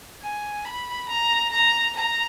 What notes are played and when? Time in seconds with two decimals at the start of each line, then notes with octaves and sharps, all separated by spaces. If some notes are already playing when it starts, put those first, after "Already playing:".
0.22 G#5
0.65 B5
1.09 A#5
1.52 A#5
1.96 A#5